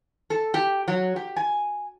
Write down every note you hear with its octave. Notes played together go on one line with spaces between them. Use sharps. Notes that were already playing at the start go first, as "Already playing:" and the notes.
A4
G4
F#3
G4
G#5